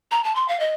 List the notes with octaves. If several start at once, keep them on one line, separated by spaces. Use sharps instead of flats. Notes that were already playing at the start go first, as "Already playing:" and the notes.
A#5
A5
C6
F5
D#5